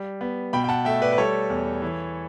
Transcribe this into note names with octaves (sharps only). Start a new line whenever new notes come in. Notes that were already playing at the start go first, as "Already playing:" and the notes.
Already playing: G3
B3
B2 G5 B5
G5
F#5 A5
A3 E5 G5
B4 D5
B4
G3 A4 C#5
E2
E3